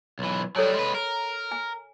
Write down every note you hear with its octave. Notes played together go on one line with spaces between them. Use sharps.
B1 E3
F#3 G3 A4 C#5 G#5
G#3 B4
A#4
G#5